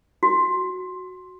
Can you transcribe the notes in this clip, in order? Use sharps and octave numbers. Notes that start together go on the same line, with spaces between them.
F#4